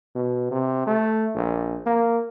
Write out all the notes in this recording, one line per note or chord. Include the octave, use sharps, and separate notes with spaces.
B2
C3
A3
A#1
A#3